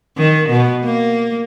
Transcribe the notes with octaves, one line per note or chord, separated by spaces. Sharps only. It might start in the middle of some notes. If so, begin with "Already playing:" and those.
D#3
B2
A#3